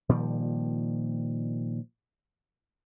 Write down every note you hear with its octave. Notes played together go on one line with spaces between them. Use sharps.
A#2 D#3 F3 G3